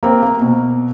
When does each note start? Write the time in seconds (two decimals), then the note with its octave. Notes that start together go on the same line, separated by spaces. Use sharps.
0.03 A#3 C4
0.22 A#3
0.41 B2